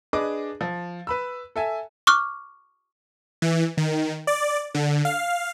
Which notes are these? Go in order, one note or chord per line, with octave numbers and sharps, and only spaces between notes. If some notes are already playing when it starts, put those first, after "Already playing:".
D4 G#4 B4 D#5 D6
F3
B4 B5 E6
A4 E5 G#5
C#6 D6 F6 F#6
E3
D#3
D5
D3
F5